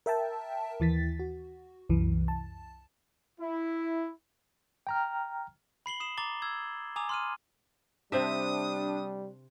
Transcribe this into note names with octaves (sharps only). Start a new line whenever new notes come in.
A#4 E5 G5 A5
D#2 E3 A6 B6
F#4
C2 F#2 E3
A5
E4
G5 A#5 F6
B5 C7 F#7 G7
D#6 C7 E7
A#5 D6 A6 G7
E6 G#6
G#5 A#5 D6 D#6 F7
C6 F6 D#7
C3 G3 C4 D4 E5 D#6